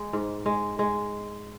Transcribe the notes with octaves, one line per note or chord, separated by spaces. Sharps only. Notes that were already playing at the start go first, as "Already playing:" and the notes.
Already playing: G#3
G#2
G#3
G#3